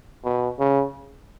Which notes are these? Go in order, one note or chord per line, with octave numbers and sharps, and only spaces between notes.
B2
C#3